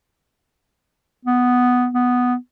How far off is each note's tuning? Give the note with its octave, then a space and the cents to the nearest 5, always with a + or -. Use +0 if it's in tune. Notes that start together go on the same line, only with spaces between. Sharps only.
B3 +5
B3 +0